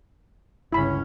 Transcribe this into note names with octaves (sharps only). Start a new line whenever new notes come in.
G1 C#2 C#4 E4 B5